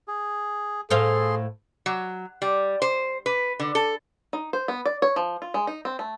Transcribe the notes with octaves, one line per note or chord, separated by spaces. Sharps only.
G#4
A2 G#4 A4 C5 F5 C6
F#3
G3
C5
B4
D3
A4
D#4
C5
B3
D5
C#5
F3
F4
G#3
D#4
C4
A3